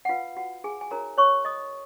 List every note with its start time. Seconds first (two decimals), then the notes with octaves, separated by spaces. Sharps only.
0.05 F#5
0.09 F4 B4 F5
0.37 F#4 F#5
0.64 G#4 G#5
0.81 G#5
0.91 D#4 F#4 A#4 C#5 A#5
1.18 C#5 C#6
1.45 D#5 D#6